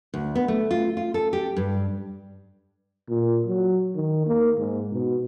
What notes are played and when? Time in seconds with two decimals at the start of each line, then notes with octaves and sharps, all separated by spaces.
0.14 D2
0.35 B3
0.48 A3
0.71 F4
0.97 F4
1.14 A4
1.33 G4
1.57 G2
3.09 A#2
3.46 F#3
3.95 D#3
4.27 A#3
4.58 G#2
4.92 B2